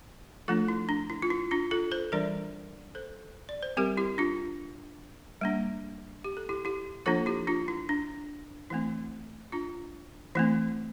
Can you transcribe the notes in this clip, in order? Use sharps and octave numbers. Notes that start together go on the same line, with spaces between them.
F3 A3 D4 F4 A4
E4
D4
E4
F4
E4
D4 F4
F4 A4
A4 C5
E3 G3 D4 A#4 D5
A4 C5
D5
C5
G3 C4 G4 A#4
E4 G4
D4 F4
G3 A#3 D4
G4
A4
E4 G4
E4 G4
F3 A#3 D4 F4 A4
E4 G4
D4 F4
E4
D4
E3 A3 C4 E4
D4 F4
E3 A3 C4 E4